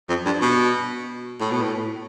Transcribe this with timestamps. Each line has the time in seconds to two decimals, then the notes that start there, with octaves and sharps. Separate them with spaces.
0.09 F2
0.26 G2
0.42 B2
1.41 A2
1.52 B2
1.62 A2